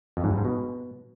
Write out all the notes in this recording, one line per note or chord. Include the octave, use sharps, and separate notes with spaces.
F2
G#2
G2
G#2
B2